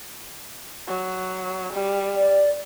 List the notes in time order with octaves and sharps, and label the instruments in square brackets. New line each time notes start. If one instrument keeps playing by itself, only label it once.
[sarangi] F#3
G3
[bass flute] D5